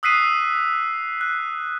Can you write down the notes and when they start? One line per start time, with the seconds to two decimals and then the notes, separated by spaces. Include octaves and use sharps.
0.03 D#6 E6 F#6 B6 C7 D#7
1.21 F#6